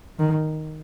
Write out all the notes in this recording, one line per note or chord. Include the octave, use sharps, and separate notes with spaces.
D#3